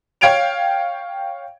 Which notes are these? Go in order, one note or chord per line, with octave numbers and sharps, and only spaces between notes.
C#5 F5 G5 G#6 D7 F7